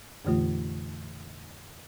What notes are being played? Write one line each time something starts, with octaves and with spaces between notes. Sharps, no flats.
F2 A#2 D3 E3 A3 F4